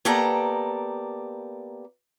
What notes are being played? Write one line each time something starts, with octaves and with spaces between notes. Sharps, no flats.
A#3 B3 G4 A4 D5 A#5